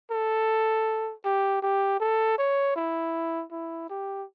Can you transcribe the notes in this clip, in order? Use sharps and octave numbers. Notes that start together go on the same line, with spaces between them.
A4
G4
G4
A4
C#5
E4
E4
G4